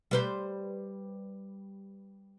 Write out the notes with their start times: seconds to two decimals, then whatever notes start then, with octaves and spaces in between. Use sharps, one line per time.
0.11 G3 B4 C5